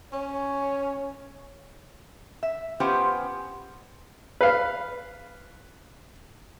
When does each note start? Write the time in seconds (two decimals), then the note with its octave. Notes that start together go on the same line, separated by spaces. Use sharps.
0.13 C#4 C#5
2.43 E5
2.80 B3 C#4 F4 G4 C5 G#5
4.41 B4 F5